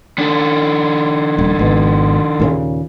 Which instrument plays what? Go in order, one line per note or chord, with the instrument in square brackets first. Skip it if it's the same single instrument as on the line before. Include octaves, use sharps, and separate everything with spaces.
[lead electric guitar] D#3 D4
[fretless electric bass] D#1
G#1 B2
D#2 A#2 C#3